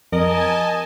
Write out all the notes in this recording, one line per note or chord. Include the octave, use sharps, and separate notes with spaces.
F2 A#4 D#5 G#5 A5